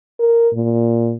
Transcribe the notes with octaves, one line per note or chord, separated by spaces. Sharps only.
A#4
A#2